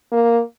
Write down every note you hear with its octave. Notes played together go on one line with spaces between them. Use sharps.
A#3